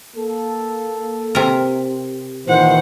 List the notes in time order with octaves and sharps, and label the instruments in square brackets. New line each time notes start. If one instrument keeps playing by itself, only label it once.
[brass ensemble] A#3 A4
[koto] C3 A#4
[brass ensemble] A#2 D#3 E3 [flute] C5 [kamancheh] F#5